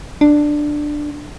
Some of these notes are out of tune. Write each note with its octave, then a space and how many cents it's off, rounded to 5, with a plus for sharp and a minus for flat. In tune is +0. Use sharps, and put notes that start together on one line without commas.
D4 +10